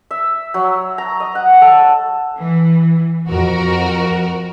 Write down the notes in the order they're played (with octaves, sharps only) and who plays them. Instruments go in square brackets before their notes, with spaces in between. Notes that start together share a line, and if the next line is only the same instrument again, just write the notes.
[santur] E5
F#3
A#5
D#5
F#5
A4
[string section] E3
F2 F#4 A#4